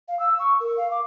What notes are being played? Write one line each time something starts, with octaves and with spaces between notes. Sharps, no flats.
F5
E6
C#6
A#4
F5
D6